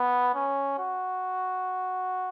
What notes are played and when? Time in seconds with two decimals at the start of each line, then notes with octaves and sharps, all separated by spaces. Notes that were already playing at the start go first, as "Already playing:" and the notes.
Already playing: B3
0.35 C#4
0.79 F#4